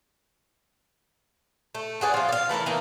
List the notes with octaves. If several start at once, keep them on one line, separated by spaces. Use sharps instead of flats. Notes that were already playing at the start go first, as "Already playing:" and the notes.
A3
F#4 G#4 B4 D5
F3 F4
D5 F5
E3 A3 E4 A#4
E3 A#3 D#4